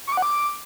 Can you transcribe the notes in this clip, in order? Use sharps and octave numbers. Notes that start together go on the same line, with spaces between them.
C#6
D6
F#5
D6